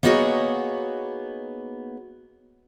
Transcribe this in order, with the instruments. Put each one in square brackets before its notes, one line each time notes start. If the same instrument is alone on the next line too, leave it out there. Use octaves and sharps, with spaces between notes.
[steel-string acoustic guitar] A#3 B3 D#4 F#4 G#4 C#5